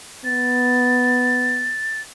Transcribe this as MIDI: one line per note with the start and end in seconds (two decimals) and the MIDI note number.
0.25 1.74 59
0.25 2.01 93